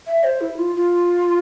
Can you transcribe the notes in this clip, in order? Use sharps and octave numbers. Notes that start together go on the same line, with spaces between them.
E5
C5
E4
F4
F4